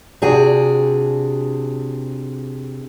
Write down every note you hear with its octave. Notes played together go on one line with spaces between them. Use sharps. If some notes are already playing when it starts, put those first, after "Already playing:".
C3 D4 F#4 G#4